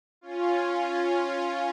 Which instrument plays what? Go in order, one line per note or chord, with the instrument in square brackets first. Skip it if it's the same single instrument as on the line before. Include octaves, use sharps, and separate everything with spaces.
[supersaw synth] C#4 F4